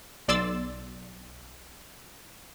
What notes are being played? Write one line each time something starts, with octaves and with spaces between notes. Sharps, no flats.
B1 D5 C6 E6 A6